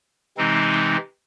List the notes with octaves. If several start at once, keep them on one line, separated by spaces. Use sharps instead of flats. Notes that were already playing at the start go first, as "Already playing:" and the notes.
C3 E3 G#3 C4 D#4